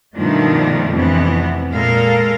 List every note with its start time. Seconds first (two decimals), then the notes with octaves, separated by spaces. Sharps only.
0.17 G2 B2 D#3 F3 A3 D4
0.92 F2 A2 C3 E3 B3
1.71 A#2 G#3 A4 A#4 F5